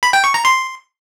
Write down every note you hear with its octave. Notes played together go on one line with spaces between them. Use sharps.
B5
G5
C#6
A#5
C6